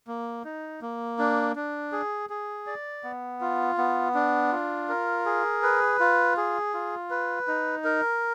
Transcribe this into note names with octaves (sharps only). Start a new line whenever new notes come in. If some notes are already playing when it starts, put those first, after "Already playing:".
A#3
D#4
A#3
D4
D4
G#4
G#4
D5
B3
F4
B3
D4
F4
A#4
G#4
B4
F4
G#4
F4
B4
D#4
A#4